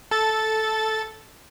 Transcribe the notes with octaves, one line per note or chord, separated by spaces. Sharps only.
A4 A6